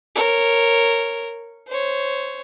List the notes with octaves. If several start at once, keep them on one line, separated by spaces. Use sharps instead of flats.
A#4 C#5
C5 C#5